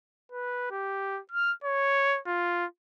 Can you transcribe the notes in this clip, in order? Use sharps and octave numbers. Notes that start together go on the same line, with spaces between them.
B4
G4
F6
C#5
F4